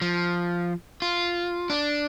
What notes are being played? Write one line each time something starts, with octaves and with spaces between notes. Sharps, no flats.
F3
F4
D4